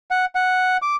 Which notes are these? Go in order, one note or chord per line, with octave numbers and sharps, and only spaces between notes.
F#5
F#5
D6